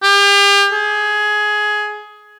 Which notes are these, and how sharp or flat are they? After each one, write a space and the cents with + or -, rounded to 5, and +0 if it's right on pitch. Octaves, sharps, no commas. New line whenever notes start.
G4 +40
G#4 +15